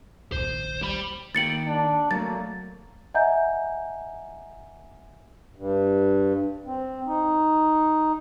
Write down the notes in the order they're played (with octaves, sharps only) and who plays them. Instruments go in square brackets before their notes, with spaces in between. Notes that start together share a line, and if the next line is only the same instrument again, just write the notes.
[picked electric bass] D#1 A#1 [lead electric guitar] C5
[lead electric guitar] G3 B5
[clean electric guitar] D#2 A#3 G5 [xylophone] A6 C#7 F#7
[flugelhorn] D4
[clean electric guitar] F#3 A3 [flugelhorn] A#3 [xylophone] A6
[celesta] D#5 E5 F#5 G#5 A#5 G6
[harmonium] G2
C4
D#4